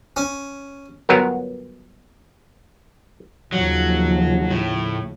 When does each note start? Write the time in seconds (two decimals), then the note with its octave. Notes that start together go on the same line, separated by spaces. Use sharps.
0.17 C#4
1.09 G1 F#3 B3 A#4
3.52 D#2 C#3 F3 F#3
4.50 A2